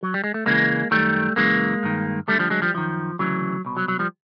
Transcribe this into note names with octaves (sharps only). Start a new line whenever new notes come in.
F#3
G3
G#3
A3
C#2 C#3 E3 G#3 A#3
F#2 D#3 G3 A3
F#2 C#3 E3 G#3 A#3
G2 D#3
D2 D3 G3 A3
F3 G3
F#3 G#3
F3 G3
F#2 D#3 F3
D2 C#3 E3 F#3
C2 B2
F#3
F#3
F3 G3